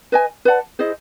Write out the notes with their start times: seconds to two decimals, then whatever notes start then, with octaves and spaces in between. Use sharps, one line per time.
0.12 B4 D#5 G#5
0.45 B4 D5 F#5 A5
0.79 E4 G#4 C5 D#5